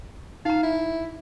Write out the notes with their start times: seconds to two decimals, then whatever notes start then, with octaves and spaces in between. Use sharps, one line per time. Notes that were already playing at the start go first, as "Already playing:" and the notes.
0.45 D#4 F5 A#5
0.63 E4